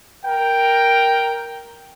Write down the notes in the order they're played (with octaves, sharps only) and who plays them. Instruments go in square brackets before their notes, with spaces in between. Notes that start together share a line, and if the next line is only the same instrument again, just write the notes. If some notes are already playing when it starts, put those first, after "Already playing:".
[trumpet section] A#4 G5